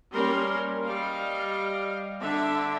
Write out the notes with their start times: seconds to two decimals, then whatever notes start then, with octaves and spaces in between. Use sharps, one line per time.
0.13 G3 A#3 C#4 A#4 C6
0.84 G3 D#5 F5
2.20 D3 D4 E5